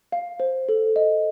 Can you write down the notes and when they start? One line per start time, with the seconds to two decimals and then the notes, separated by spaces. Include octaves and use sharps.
0.12 F5
0.40 C5
0.69 A4
0.96 D#5